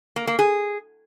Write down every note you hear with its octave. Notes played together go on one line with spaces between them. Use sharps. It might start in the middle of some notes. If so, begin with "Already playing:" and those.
A#3
A#3
G#4